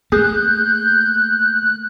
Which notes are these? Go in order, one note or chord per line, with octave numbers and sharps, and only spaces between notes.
A3 A#3 G#4 F#6 G6